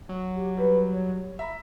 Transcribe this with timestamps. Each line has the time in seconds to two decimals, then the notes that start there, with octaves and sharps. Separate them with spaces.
0.09 F#3
0.34 G4
0.57 G3 B4
0.92 C#5
1.39 E5 A#5 B5